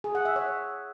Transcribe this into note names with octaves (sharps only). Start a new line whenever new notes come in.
G#4
F#5
E5
C#5